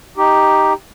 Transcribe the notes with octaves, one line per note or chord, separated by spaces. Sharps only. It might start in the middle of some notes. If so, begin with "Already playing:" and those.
D#4 G4